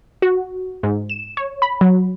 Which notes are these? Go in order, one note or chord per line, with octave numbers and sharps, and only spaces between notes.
F#4
G#2
E7
C#5
B5
F#3